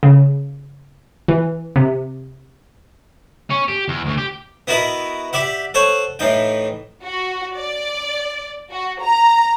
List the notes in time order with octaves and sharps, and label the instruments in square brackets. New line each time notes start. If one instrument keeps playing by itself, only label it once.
[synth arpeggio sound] C#3
E3
C3
[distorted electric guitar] C#4
G4
E2
D2
G4
[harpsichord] B3 E4 F#4 A#4 B4 D#5
G4 D5 E5 F#5
A4 C5 C#5 F#5
A2 E3 D#4 G5
[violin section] F#4
D5
F#4
A#5